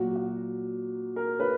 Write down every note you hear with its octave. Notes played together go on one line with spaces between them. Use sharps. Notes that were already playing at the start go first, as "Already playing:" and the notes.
Already playing: A#2 F#3 F#4
F#4
A#4
B4